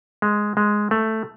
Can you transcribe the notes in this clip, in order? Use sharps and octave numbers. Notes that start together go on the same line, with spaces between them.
G#3
G#3
A3